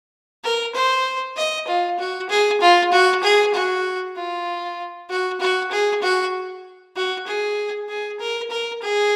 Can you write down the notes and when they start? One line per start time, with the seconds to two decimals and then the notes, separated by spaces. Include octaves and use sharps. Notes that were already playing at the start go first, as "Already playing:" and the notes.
0.44 A#4
0.75 C5
1.36 D#5
1.67 F4
1.99 F#4
2.29 G#4
2.61 F4
2.92 F#4
3.23 G#4
3.54 F#4
4.16 F4
5.09 F#4
5.40 F#4
5.71 G#4
6.02 F#4
6.96 F#4
7.27 G#4
7.89 G#4
8.20 A#4
8.50 A#4
8.82 G#4